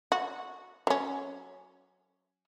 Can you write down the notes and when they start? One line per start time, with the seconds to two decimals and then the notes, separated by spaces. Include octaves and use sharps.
0.12 F#4
0.87 F#3 C#4